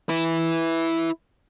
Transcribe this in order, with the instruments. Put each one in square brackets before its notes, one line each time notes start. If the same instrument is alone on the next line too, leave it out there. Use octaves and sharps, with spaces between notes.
[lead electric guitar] E4 B4